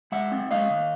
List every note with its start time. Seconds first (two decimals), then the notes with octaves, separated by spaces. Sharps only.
0.12 G#3 E5 F#5
0.32 C4
0.51 G#3 D#5 F5
0.71 D#3